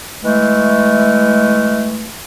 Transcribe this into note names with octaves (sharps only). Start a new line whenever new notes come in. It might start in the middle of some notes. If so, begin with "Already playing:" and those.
E3 G#3 A3